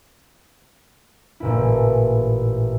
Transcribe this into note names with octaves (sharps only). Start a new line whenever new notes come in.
A1 A#2 E4